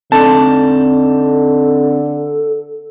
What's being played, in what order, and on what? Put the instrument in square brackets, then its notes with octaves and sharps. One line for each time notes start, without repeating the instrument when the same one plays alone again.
[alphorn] D3 [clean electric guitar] C4 D#4 D5 [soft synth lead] A4 [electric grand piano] A5